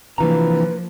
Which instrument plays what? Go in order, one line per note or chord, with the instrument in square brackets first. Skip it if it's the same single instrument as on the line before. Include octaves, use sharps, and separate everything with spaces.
[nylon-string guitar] C3 E3 [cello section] F3 A#3 [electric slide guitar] D4 F4 A#5 [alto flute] B4